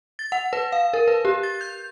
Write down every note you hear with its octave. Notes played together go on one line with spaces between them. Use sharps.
A6
F#5
B4
F5
A#4
B4
G4
A6
G6